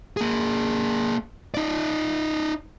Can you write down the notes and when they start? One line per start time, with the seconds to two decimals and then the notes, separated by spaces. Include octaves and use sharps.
0.17 A#3 G#4
1.54 D#4 D5